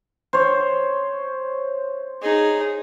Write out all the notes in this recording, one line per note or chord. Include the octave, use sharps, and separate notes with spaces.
C5 C#5
D#4 G#4